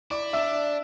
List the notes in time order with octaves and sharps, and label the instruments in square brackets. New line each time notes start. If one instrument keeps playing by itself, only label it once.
[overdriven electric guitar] E4 [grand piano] D5 D6
[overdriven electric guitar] D4 [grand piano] E5 E6